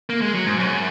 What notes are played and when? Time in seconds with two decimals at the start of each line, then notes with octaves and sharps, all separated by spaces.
0.09 A#3
0.22 G#3
0.34 F#3
0.47 G#2
0.59 F#2